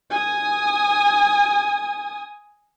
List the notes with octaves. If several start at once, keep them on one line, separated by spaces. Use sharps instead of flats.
G#5 D#6